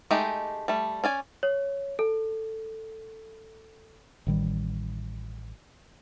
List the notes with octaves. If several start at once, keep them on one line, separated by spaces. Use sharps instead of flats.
G#3 A3 D#4 G4
G3 A3
C#4 D5 G#5
C#5
A4
A1 D#3 G3